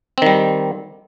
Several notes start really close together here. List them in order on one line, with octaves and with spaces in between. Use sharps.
C4 D#3 G3